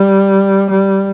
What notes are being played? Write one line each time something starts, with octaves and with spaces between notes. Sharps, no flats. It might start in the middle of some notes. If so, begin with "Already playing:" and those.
Already playing: G3
G3